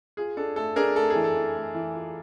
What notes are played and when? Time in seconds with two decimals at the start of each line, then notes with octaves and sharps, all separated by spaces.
0.17 F4 G#4
0.37 D4 A4
0.56 A3 A4
0.76 D4 G#4 A#4
0.96 A3 A4
1.10 G#4
1.16 E3
1.24 A4
1.35 E3
1.55 A3
1.75 E3
1.94 F4